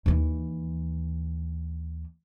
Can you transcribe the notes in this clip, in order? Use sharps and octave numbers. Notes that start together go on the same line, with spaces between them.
D#2 E3